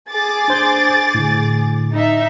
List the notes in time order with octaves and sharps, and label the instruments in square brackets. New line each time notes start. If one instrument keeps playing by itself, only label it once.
[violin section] G#4 D6 A6
[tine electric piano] D4 C5 G6
A2 D3
[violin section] D#4 E5